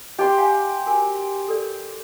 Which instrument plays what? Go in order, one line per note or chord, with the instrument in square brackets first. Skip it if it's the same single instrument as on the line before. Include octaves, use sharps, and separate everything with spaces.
[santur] G4 C6 [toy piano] D#5
[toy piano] F5 F#5 G#5
F#4 A#4 G#5
A4 A#4 D5